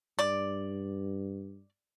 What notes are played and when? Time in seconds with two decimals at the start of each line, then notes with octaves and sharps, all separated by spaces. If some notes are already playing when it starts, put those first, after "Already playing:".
0.19 G2 D5